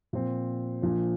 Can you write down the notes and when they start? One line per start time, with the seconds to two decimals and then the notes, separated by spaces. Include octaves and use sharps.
0.13 A#2 F3 C4
0.82 A#1 A#2 F3